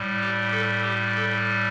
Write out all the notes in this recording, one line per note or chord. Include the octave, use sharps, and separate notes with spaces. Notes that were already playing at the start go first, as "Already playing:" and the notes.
Already playing: A2 G3
G4
A4
G4
A4